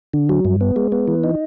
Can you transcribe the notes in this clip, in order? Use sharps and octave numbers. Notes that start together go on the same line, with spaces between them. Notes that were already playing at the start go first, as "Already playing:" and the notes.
D3
F#3
G2
B3
G#3
B3
E3
D#4